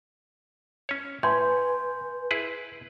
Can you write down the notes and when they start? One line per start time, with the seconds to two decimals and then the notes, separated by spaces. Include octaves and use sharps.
0.89 C#4 C#5
1.23 A2 B4 G#5 C6 G6
2.31 E4 G#4 B4